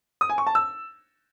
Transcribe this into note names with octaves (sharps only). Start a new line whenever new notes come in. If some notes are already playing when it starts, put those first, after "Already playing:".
D#6
G#5
C#6
A5
E6